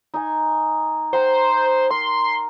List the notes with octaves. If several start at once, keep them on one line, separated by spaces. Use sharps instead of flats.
D#4 G#5
C5 F#5 G5 A#5
A#4 C6